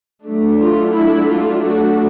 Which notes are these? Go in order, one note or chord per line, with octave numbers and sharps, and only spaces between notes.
F#3 A3 D4
F4
E4
F4
F#4